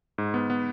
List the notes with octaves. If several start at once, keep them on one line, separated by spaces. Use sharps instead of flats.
G#2
B3
B3